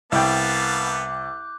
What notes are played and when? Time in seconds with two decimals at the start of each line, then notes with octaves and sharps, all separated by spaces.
0.12 C2 B3 F5 G5 A5 D6 F#6 G6